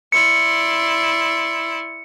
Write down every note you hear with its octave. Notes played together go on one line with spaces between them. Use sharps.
E4 D5 C6 C#7